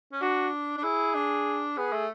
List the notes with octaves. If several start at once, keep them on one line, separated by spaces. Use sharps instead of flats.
C#4
D4 F#4
D4
E4 G#4
D4
B3 G#4
A3